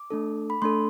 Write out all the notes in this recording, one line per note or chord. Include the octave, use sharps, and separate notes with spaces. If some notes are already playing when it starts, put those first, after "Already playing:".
Already playing: D6
A3 D4 A4
B5
A3 D4 A4 C6